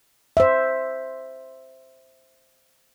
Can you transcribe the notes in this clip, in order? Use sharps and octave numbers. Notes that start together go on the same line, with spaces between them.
C5 E5